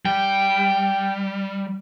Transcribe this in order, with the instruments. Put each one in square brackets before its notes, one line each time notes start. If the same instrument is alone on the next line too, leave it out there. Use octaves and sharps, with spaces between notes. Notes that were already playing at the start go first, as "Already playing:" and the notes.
[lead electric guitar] G3 [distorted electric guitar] G5